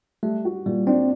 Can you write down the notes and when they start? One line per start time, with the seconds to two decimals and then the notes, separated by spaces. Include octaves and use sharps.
0.23 G3 A3
0.45 F#4
0.66 A#2 G3
0.87 C4 D4